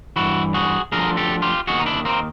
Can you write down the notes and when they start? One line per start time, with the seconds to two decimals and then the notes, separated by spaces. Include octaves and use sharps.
0.16 G2 E3 E4 F#4
0.54 F#4 G#4
0.92 D2 D3 F3 G#4 A#4
1.17 G4 A4
1.42 F4 G4
1.67 D#2 D#3 F#4 G#4
1.79 D#4
1.86 D4 E4
2.05 A#3 C4